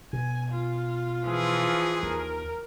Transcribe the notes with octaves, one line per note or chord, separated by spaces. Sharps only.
B2 G#5
F4
E3 F3 G#4
D#2 A#4